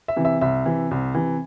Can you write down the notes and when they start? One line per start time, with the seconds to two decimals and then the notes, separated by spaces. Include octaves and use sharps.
0.08 E5
0.16 C3 E3
0.25 E5
0.41 C2 E5
0.66 C3 E3
0.91 C2
1.15 C3 E3